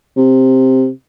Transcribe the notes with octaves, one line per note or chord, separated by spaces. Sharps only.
C3